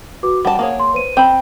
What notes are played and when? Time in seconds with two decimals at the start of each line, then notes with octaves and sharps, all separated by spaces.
0.23 F#4 B4 D6
0.45 G3 F#5 A5
0.59 A#3 G#4 C#5
0.80 C6
0.94 B4 C5 D#7
1.17 C4 B5 G6